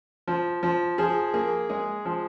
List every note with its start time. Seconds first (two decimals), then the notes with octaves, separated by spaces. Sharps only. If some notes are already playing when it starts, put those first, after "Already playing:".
0.28 F3
0.63 F3
0.98 F3 G#4
1.34 A#3 G#4
1.69 G#3 G#4
2.05 F3